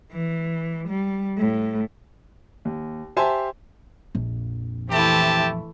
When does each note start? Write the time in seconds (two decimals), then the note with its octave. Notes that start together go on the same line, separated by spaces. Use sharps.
0.12 E3
0.89 G3
1.38 A2
2.65 D#2
3.17 G4 C5 E5 G#5 A5 C6
4.15 A#1 F2
4.90 E3 A3 C4 E4 G4 A5